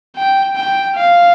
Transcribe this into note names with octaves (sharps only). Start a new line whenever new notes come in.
G5
G5
F5